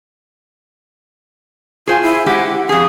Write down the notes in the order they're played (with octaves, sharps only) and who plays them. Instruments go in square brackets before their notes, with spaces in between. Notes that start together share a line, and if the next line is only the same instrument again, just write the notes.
[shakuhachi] F4 [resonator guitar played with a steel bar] G#4 C5 G#5
[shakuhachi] E4
[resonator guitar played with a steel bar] G#3 E4 G4 [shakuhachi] F#5
[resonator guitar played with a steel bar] F2 G#4 [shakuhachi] D#6